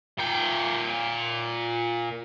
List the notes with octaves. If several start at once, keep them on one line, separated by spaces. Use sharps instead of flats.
A#2 G5